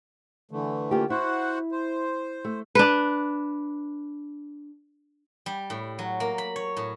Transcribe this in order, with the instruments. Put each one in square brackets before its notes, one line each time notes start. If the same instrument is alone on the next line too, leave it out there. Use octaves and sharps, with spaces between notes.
[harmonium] D3 E3 A3
[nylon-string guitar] A#3 F4 G4
[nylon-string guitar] E4 [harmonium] F#4 C5 F#5
[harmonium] C5
[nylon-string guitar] A3
[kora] D4 B4
[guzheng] G3
A2
F#3
A#3
B5
C#5
A2